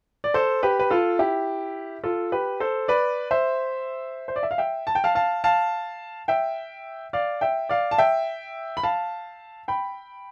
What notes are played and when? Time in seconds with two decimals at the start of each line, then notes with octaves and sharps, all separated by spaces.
0.24 D5
0.34 A4 C5
0.63 G4 B4
0.79 B4
0.90 F4 A4
1.19 E4 G4
2.04 F4 A4
2.32 G4 B4
2.60 A4 C5
2.88 B4 D5
3.31 C5 E5
4.28 C5
4.36 D5
4.43 E5
4.51 F5
4.58 E5 G5
4.87 A5
4.95 G5
5.04 F5 A5
5.15 F5 A5
5.44 F5 A5
6.28 E5 G5
7.13 D5 F5
7.41 E5 G5
7.69 D5 F5
7.91 A5
7.98 E5 G5
8.77 B5
8.83 F5 A5
9.68 G5 B5